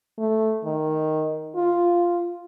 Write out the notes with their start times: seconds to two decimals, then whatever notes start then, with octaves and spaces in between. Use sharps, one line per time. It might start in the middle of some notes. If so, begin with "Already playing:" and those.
0.18 A3
0.65 D#3
1.56 F4